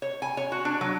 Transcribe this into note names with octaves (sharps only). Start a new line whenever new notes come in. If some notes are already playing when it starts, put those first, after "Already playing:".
C#5
G#5
C#5
F#4
D4
F#3